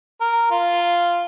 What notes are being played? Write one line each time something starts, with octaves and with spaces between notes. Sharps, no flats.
A#4
F4